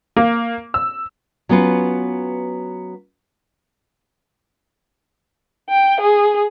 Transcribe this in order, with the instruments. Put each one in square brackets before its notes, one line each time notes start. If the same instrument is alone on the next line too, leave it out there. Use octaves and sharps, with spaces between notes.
[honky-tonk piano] A#3
E6
[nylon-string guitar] F#3 B3 C#4 F4 B4
[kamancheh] G5
G#4